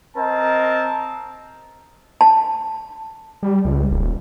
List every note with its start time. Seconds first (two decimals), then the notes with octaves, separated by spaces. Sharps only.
0.17 C4 A#4 D#5 A5
2.21 A5
3.43 G3
3.65 C#2
3.91 D#1